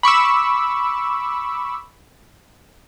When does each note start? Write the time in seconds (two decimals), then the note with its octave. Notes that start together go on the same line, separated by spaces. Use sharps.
0.03 B5 C#6 D6 E6